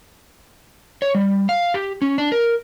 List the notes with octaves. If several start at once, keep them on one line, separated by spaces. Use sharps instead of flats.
C#5
G3
F5
G4
C#4
D4
A#4